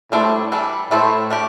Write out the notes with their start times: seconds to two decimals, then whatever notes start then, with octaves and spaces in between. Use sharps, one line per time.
0.12 A2 G3 D4 A4 C5
0.52 E3 G3 D4 A4
0.90 A2 A3 E4 A4 C5
1.30 A3 D4 G4